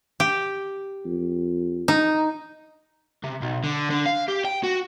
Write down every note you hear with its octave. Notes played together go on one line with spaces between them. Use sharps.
G4
F2
D#4
C3
B1
D3
D3
F5
G4
G5
F#4